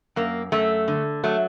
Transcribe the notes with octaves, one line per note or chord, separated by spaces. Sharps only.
F#2 A#3
F#2 A3
D3
F#3 A3